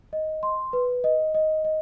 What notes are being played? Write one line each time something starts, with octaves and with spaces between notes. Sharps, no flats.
D#5
C6
B4
D#5
D#5
D#5